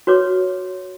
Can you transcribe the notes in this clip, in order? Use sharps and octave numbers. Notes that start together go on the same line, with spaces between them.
F#4 B4 C#5 D6